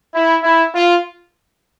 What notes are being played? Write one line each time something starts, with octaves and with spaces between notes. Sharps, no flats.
E4
E4
F4